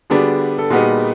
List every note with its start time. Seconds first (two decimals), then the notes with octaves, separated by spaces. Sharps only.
0.10 D3 G3 B3 D4 F#4 G#4
0.58 A4
0.70 A#2 G3 B3 D#4 F#4 G#4